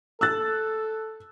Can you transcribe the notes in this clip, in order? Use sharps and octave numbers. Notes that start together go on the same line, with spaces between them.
A4 E6 F#6 A6